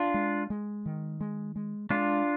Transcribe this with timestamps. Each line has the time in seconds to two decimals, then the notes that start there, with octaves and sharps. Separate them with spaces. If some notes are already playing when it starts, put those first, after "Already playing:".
Already playing: D4 F4
0.14 G#3
0.50 G#3
0.86 D#3
1.21 G#3
1.56 G#3
1.90 G#3 D4 F4